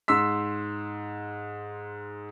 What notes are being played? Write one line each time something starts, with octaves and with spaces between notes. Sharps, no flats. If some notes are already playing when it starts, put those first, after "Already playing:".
G#2 C6 E6 B6